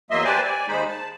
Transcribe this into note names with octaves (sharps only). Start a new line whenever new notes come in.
E2 F#3 A#3 D#5 E5 C6
G4 B4 C5 D5 G#5 A5
D5 G#5
D#2 G#3 D#4 C5 B5
A5